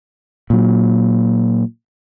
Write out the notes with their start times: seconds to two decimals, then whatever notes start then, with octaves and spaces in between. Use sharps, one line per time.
0.50 A#2 F#3